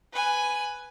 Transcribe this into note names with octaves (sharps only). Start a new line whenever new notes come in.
B4 G#5